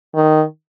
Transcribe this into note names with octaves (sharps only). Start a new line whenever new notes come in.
D#3